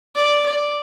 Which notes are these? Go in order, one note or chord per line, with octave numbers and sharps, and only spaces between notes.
D5
D5